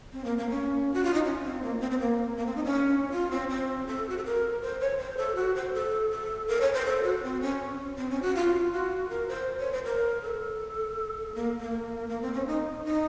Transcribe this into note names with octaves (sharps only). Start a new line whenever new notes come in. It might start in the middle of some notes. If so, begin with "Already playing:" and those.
C4
A#3
A#3
C#4
F#4
F4
D#4
C#4
C4
A#3
C4
C4
A#3
A#3
C4
D#4
C#4
F4
C4
C4
A4
F#4
A4
A#4
C5
C#5
C5
A4
F#4
C5
A4
A4
A#4
C#5
C5
A4
F#4
C4
C#4
C4
C#4
F#4
F4
F#4
A#4
C5
C#5
C5
A#4
A4
A#3
A#3
A#3
C4
C#4
D#4
D#4